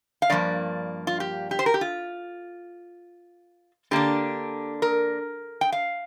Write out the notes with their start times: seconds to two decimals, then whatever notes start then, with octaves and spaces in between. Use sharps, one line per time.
0.22 F5
0.30 G2 F3 A#3 D5
1.07 F4
1.20 G4
1.51 G4
1.59 C5
1.66 A#4
1.74 G4
1.81 F4
3.91 D3 A#3 D4 G4
4.82 A#4
5.61 G5
5.72 F5